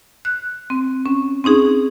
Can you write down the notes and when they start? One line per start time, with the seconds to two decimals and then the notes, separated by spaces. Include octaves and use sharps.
0.25 F#6
0.70 C4
1.06 C#4
1.44 C4 C#4 D#4 G#4